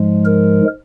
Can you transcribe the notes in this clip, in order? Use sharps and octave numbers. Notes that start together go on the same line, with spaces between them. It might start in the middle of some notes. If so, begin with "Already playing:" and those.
Already playing: G#2 F3 G#3
A#4